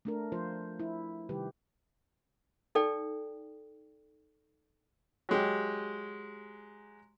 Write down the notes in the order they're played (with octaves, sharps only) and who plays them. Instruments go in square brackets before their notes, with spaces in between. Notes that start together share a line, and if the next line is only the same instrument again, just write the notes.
[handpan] A3 D4 A#4
F3 F4 C5
E4
C3 D#3 G3 G4 B4
[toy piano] D#4 A4 D5 G5
[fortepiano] F#3 G#3 G4